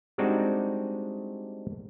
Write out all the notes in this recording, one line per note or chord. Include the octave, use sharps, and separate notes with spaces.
G3 G#3 C4 D4 D#4 F#4